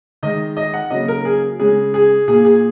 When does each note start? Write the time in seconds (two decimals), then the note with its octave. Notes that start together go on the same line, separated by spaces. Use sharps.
0.23 D#3 G#3 D#5
0.57 D#5
0.74 F#5
0.90 C#3 F#3 A#3 D#5
1.08 A#4
1.25 G#4
1.60 C#3 G#3 G#4
1.94 G#4
2.28 A#2 A#3 G#4
2.45 G#4